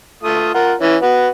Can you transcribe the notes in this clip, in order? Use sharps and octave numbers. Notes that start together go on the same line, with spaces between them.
A3 F4 D#6
F4 A#4 F#5
E3 C#4
B3 F#4